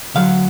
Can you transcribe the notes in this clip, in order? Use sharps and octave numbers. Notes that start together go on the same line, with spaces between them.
D2 D3 F#3 F5